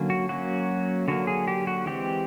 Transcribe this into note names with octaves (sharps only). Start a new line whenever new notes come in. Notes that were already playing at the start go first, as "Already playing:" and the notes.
Already playing: D3 F#3 A#3 C#4
F#4
F#3 A#3 C#4 F#4
D3 F#3 A#3 F#4
G#4
G4
F#4
E3 G#3 C4 G4